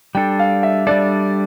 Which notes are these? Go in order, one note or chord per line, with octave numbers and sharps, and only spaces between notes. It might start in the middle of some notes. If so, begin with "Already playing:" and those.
G3 D4 A4 G5
F5
E5
G3 D4 A4 D5